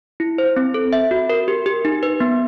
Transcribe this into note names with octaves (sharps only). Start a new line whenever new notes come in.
E4
C5
C4
A4
E5
F#4
A#4
G4
G4
D#4
B4
B3